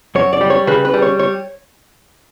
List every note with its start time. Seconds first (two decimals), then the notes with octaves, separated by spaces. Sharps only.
0.15 F#2 C#5
0.33 D5
0.41 G3
0.50 C#5
0.67 C#3 B4
0.85 B4
0.94 G3
1.02 C#5
1.19 C#5